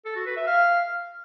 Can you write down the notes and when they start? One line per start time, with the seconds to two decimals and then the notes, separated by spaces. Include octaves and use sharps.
0.05 A4
0.16 F#4
0.26 B4
0.37 E5
0.47 F5